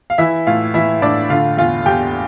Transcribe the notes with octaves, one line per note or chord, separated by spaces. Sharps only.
F5
E3 E4 E5
A2 F4 F5
E3 E4 E5
A2 D4 D5
D3 F4 F5
E2 F4 F5
E2 G4 G5